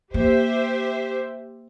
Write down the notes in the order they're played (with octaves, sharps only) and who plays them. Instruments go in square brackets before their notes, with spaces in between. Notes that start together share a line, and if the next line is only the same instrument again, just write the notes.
[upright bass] A#3 [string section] G4 C5 E5